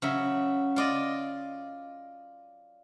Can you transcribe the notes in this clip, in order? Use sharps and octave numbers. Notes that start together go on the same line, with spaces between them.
C#3 F#3 E5
F4 D5 D#5